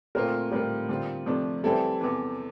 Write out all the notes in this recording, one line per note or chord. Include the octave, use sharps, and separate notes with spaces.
A#2 A3 C4 F4 A#4
A2 G3 C4 F4 A#4
D3 G3 C4 F4
F2 C3 F3 A3 D4
E3 G3 C4 E4 A4
E2 C3 E3